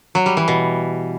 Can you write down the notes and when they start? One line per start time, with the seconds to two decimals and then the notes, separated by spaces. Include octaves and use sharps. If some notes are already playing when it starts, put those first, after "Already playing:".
0.15 F#3
0.26 G3
0.37 E3
0.48 B2